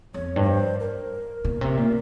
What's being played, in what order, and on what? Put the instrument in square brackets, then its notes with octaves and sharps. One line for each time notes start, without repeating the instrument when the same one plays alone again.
[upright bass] F2 [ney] C#5
[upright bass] G2
[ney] C#5
C5
A#4
[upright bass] A#2
C3
A#2